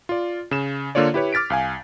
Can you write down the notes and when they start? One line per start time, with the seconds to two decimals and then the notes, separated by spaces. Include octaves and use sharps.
0.09 F4 D5
0.51 C#3 E7
0.95 D3 A#3 F4 C#5 D5
1.14 E4 G4 B4 C#5
1.33 D6 F6 A6 B6 D7
1.50 C2 F5 G#5